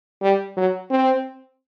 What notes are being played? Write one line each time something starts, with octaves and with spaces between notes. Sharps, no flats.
G3
F#3
C4